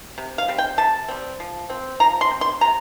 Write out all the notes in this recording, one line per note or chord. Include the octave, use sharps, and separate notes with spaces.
C3
F5
G3 C4
G5
C3 A5
G3 C4
F3
C4
F3 A#5
C6
C4
C6
C3 A#5